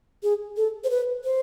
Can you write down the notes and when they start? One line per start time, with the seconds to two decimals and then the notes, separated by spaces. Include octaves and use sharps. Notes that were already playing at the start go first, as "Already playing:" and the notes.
0.23 G#4
0.57 A4
0.84 C5
0.90 B4
1.24 C5